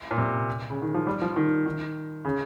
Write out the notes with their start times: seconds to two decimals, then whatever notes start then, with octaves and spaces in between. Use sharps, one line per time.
0.11 A#2
0.18 C3
0.70 C#3
0.82 D#3
0.94 F3
1.07 G3
1.22 F3
1.36 D#3
1.66 D#3
2.25 C#3